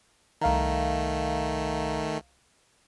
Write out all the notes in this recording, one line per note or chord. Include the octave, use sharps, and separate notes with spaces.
C2 D#3 A3 F5 A#5